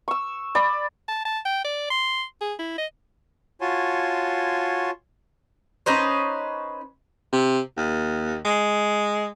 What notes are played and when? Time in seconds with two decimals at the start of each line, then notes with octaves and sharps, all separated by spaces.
0.08 C#6 E6
0.55 D5 B5
1.08 A5
1.25 A5
1.46 G5
1.64 D5
1.90 C6
2.41 G#4
2.59 E4
2.78 D#5
3.61 F4 F#4 C#5 G#5 A5 C6
5.86 C#4 D#4 B4 C5
7.32 C3
7.77 D#2
8.45 G#3